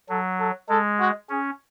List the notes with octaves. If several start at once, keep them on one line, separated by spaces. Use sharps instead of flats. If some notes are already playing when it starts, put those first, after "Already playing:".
F#3 A4
A4
G#3 A4
F#4
C#4 G#4